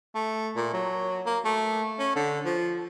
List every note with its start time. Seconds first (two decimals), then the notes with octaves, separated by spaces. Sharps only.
0.15 A3
0.56 A#2
0.73 F#3
1.26 A#3
1.45 A3
1.99 C#4
2.16 D3
2.45 F3